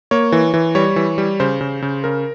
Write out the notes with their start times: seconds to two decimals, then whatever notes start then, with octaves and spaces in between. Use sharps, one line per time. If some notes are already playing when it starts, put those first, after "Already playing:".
0.11 A#3 C#5
0.32 E3
0.54 E3
0.75 G3 C#5
0.96 E3
1.18 G3
1.40 C#3 C5
1.61 C#3
1.82 C#3
2.04 C#3 A#4